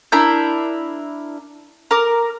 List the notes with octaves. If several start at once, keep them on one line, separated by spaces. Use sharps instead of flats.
D4 E4 A#4 G6
A#4 D6